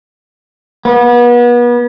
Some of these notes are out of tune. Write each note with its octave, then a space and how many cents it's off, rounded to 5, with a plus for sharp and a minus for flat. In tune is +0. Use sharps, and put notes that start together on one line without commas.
B3 -35